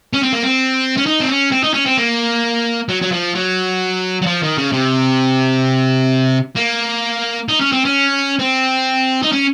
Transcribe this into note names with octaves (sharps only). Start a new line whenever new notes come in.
C#4
C4
A#3
C4
C#4
D#4
C4
C#4
C4
D#4
C#4
C4
A#3
F#3
F#3
F3
F#3
F#3
F3
D#3
C#3
C3
A#3
D#4
C#4
C4
C#4
C4
D#4
C#4